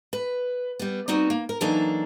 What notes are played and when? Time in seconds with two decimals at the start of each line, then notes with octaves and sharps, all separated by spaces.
0.13 B4
0.79 G3 B3
1.08 G3 B3 C4 D#4 F#4
1.30 A#3
1.49 A#4
1.61 E3 F#3 A#3 D4 D#4 A4